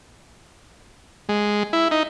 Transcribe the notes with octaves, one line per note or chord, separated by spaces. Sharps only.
G#3
E4
D#4